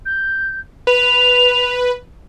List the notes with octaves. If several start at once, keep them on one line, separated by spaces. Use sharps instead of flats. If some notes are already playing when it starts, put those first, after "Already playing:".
G6
B4 F7